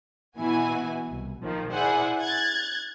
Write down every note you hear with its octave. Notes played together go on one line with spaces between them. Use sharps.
B2 E3 B3 E4 F#4 G#5
C2
A#1 D#3 F3
E4 G#4 C5 D5 F#5 G#5
F#6 G#6 A6